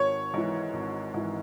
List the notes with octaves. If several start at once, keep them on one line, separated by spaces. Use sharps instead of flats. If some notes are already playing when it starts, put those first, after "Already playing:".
Already playing: G#1 C#5
G#2 E3
G#1
G#2 E3